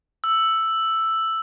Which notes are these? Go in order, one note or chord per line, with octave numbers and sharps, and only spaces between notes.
E6